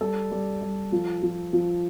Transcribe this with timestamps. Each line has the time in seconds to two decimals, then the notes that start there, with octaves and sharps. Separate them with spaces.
0.01 G3 A4
0.31 G3
0.62 G3
0.92 F3
1.23 F3
1.53 F3